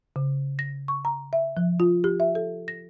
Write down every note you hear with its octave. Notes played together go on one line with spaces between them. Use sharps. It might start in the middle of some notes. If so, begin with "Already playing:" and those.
C#3
A#6
C#6
A#5
E5
F3
F4
G4
E5
A4
A#6